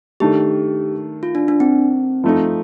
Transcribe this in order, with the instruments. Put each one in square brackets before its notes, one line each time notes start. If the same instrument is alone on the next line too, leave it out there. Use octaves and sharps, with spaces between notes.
[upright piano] D#3 A3 D4 [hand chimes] G4
[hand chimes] F4
D4
D4
C4
[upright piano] F3 A3 D#4